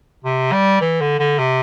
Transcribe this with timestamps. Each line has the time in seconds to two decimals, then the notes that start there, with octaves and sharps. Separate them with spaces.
0.25 C3
0.52 G3
0.81 E3
1.01 D3
1.19 D3
1.38 C3